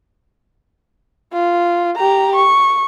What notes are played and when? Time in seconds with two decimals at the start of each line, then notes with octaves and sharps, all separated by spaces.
1.33 F4
1.96 G4 A#5
2.36 C#6